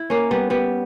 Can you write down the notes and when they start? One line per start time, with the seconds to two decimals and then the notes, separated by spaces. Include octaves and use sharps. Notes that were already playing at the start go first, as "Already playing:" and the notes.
Already playing: E4
0.10 A#3 C#4
0.31 G3 B3
0.50 G3 B3